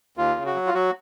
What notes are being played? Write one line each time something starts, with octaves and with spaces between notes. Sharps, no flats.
D#2 F4
C#3
F#4
F#3
F4
F#3 F#4